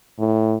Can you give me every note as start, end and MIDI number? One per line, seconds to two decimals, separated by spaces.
0.19 0.57 45